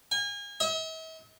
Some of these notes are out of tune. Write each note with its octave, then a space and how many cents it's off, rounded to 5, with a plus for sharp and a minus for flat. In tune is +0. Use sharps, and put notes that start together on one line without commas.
G#5 -35
E5 -45